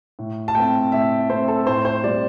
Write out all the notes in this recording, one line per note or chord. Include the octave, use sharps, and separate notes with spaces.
A2
A5
A3 C4 G5
A2 E5
A3 C4 C5
A4
A2 C5
C5
G3 C4 D5